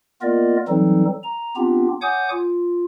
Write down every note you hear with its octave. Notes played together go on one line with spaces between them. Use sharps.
A#3 B3 F4 A#4 D5 D#5
E3 F#3 G3 C4 D#4 A4
A#5
B3 C4 D4 F4 G4
C#5 F#5 G#5 D6 D#6 G6
F4